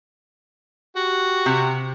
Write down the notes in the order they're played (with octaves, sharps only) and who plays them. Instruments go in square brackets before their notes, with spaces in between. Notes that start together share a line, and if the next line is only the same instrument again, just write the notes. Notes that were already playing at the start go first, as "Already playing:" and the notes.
[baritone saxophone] F#4 [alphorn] G4
[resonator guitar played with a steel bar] C3